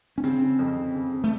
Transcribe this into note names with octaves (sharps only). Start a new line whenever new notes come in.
C#4
C#3 C4
C#3
F2
C#3
C#3
C#3
A3